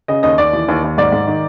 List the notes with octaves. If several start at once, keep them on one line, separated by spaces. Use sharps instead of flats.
C#3 D#5
D#2 D#5
D#2 D5
E3
D#2
D#2
G#2 D5
G#2
D#3